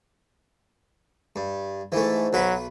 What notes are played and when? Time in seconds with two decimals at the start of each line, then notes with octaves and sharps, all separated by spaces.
1.36 G2
1.92 G#2 E3 A3
2.33 B1 F#3 B4 B5